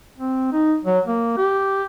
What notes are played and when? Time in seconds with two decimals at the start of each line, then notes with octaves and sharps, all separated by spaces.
0.18 C4
0.52 D#4
0.84 F#3
1.07 A#3
1.37 G4